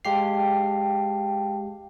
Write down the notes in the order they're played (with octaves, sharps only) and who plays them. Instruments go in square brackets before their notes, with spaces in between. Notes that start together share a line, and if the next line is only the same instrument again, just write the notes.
[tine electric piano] G#3 G4 C7 [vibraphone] F5 G5 A5